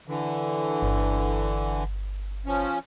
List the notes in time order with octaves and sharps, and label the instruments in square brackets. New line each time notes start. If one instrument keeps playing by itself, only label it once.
[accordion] D3 E3
[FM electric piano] G1
[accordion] F3 C#4